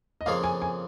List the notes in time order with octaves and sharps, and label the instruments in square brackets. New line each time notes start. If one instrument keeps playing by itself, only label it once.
[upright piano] D#5
[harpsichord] F2 C#3 A#3 F4 G#4 [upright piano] F5
[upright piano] G#5
G#5